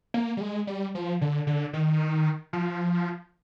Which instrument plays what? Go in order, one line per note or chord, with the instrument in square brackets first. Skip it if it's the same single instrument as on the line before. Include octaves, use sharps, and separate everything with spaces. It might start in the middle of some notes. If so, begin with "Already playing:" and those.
[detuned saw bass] A#3
G3
G#3
G3
F3
D3
D3
D#3
F3